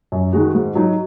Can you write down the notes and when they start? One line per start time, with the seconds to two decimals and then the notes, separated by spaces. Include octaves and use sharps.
0.12 F#2
0.33 D#3 G#3 F#4
0.55 G#2
0.75 F#3 D#4 F#4